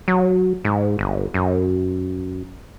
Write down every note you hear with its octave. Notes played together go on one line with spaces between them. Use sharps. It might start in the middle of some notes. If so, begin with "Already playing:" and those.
F#3
G#2
G1
F#2